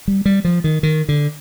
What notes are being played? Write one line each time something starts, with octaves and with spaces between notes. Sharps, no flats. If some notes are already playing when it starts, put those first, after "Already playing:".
G3
G3
F3
D#3
D#3
D3